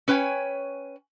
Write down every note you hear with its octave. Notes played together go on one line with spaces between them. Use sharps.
C#4 B4 C#5 G5 G#5